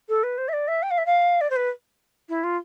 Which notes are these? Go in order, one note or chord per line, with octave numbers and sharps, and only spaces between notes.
A4
B4
C5
E5
D5
E5
G5
F5
E5
F5
D5
C5
B4
E4
F4